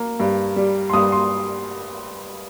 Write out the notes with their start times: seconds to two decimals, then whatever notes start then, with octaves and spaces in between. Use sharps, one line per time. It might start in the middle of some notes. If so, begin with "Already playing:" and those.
Already playing: A#3
0.20 G2
0.56 G3
0.89 C6
0.93 G2 D#6
1.12 C6